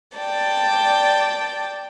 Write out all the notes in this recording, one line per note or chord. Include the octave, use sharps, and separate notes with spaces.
D5 G5 A5